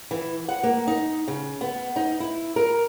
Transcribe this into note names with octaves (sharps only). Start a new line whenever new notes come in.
E3
F#5
A#3
D#4
C#3
B3
D#4
E4
A#4